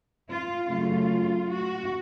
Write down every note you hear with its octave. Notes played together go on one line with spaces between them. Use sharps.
F4
F#2 C#3 F#3 A3 F4
F#4